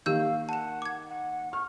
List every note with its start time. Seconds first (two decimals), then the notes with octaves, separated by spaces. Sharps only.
0.06 D#3 A#3 G4 F5 E6 G6
0.49 F#5 A5 E7
0.82 D6 G#6
1.09 F#5
1.53 C#6 F6